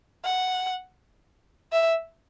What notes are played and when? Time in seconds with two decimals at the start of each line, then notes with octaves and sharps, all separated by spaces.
0.25 F#5
1.72 E5